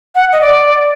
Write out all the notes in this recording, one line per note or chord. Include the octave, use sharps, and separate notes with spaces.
F#5
D#5
D5